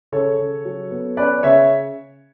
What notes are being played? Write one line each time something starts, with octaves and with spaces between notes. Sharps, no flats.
C#3 A4 C#5
C#3
F#3
B3
C#4 B4 D5
C#3 C#5 E5